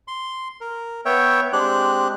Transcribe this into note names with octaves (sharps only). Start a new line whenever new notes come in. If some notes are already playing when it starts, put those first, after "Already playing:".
C6
A#4
B3 C#5 E5 G5
G#3 C4 D4 G4 F#6